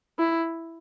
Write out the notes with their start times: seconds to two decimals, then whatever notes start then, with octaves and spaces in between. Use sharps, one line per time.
0.19 E4